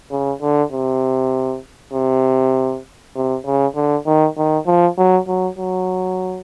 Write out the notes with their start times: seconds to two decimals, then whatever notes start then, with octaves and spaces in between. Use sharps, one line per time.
0.11 C#3
0.42 D3
0.72 C3
1.93 C3
3.16 C3
3.45 C#3
3.75 D3
4.06 D#3
4.37 D#3
4.67 F3
4.98 F#3
5.28 F#3
5.59 F#3